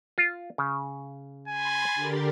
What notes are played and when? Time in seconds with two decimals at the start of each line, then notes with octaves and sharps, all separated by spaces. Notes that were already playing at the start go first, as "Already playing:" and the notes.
0.18 F4
0.58 C#3
1.48 G#5 B5 C6 A6
1.95 D3 G4 A#4